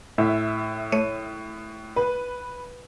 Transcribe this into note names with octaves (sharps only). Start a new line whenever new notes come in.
A2 E5
A3 C#5 D#7
B4